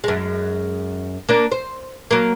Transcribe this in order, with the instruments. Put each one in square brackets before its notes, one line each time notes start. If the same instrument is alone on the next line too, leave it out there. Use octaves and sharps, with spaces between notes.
[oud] F#2 G#3
A#3 D4
C5
F#3 A#3